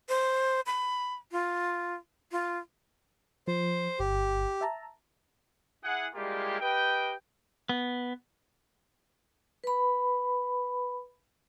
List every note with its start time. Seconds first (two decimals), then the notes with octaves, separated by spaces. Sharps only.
0.09 C5
0.66 B5
1.32 F4
2.32 F4
3.48 F3 C5
3.99 G1 G4
4.61 E5 A5 A#5
5.84 E4 G#4 F#5
6.14 G3 G#3 A#3 E4 F4 G4
6.60 G4 B4 D#5 G5
7.69 B3
9.64 B4 B5